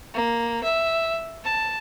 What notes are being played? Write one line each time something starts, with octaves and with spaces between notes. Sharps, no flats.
A#3
E5
A5